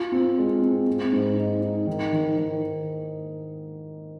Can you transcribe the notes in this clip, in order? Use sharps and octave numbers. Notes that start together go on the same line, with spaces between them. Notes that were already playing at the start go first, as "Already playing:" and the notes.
Already playing: F4
C4
G#3
C4
C4
G#2
D#4
D#4
D#3
D#3
D#3